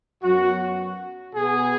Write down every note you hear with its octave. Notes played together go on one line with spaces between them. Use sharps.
F#2 F#3 B3 F#4
B2 B3 G#4